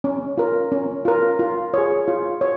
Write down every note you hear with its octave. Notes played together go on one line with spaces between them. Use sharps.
C#4
F4 A#4
C#4
F4 A#4
F4
G#4 C#5
F4
C#5